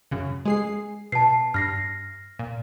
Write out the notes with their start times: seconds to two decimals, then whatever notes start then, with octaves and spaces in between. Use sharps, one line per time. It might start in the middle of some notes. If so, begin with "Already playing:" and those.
0.11 F#2 C#3
0.45 G#3 G#4 C7
1.12 B2 A5 C7
1.54 G2 F6 A#6 C7
2.39 A#2